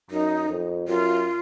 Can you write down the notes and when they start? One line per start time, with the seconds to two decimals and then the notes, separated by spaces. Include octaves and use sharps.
0.11 F#2 D#4
0.49 F2
0.88 F#2 F4